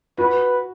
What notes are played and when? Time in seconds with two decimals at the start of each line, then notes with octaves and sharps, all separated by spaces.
0.18 F#4 B4